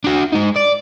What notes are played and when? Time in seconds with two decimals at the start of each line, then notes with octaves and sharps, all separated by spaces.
0.04 D4 F#4
0.33 G#3 D#4
0.56 D5